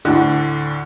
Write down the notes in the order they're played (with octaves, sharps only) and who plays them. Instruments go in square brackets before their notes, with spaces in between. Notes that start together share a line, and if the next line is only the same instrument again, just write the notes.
[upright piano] D2 A2 D3